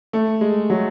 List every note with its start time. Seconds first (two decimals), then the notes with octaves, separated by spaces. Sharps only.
0.13 A3
0.41 G#3
0.70 F#3